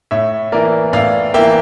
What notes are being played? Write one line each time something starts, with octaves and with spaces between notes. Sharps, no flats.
A2 C#5 E5
E3 A#3 A#4 D5
A2 D5 F5
E3 A#3 E5 G5